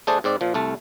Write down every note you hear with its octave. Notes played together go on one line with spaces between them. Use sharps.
A3 D4 G#4 C5 G#5 A5
G#2 C4 D5
A#2 F3
C2 A3 A5